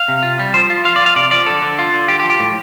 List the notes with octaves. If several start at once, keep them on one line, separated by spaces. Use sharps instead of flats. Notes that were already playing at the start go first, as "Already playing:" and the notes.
Already playing: F5
C3
F4
G3
F3 C5
F4
F4 F5
D5
F4
F5
C3 D5
F3 D5
D3 A4
D3
F4
D3
F4 G4
G4
F3
G4
A2